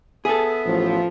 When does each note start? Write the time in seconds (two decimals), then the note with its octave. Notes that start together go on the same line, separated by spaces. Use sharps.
0.25 B3 G#4 A4 E5
0.65 A1 F3